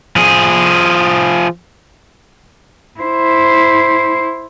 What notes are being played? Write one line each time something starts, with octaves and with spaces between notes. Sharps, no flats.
F3 G#4
E4 C5